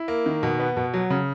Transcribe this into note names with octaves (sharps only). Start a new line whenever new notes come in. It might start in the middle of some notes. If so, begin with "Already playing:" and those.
Already playing: E4
A#3
D#3
B2
B3
B2
F#3
C#3